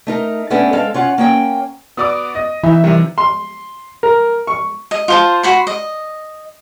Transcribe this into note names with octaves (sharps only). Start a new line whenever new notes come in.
A3 D#4 A#4
A3 B3 C#4 D4 A4
G#3 C4 A4 F5
C#4 F4 F#5
A#3 C#4 G5
B3 F#4 D5 D6 D#6
D#5
E3 B3 D#4 E5
C3 D#3 G3
C6
A#4
C#6
D#5
F4 C5 A5
F#4 B5 C6
D#5